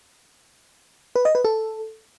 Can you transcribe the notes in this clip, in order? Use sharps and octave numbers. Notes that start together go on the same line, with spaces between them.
B4
D#5
B4
A4